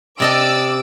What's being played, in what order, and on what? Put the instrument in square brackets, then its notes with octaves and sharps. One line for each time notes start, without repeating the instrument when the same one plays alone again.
[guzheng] C3 D#5 A5 [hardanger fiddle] D5 [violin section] D6 E6 D7